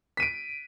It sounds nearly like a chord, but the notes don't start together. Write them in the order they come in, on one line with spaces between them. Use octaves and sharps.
B6 D#7 D7